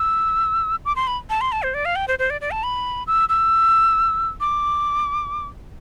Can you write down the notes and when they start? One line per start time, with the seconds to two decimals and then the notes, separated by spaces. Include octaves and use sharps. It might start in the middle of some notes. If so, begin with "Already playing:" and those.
Already playing: E6
0.85 D6
0.96 C6
1.07 B5
1.30 A5
1.41 C6
1.52 A5
1.63 C5
1.74 D5
1.85 F5
1.96 G5
2.08 C5
2.19 C5
2.30 D5
2.41 D5
2.51 A5
2.63 B5
3.07 E6
3.29 E6
4.41 D6